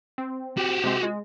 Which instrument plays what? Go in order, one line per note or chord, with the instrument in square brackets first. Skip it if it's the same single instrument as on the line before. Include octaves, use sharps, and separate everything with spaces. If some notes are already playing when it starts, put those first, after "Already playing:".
[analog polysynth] C4
[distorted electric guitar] F#4 G4
[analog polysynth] C3 G#3 C4
G#3